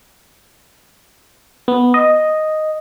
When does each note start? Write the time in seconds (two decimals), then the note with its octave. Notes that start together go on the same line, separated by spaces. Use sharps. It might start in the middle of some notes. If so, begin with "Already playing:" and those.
1.68 B3
1.94 D#5